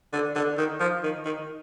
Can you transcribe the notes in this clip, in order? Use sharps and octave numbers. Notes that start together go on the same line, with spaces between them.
D3
D3
D#3
F3
D#3
D#3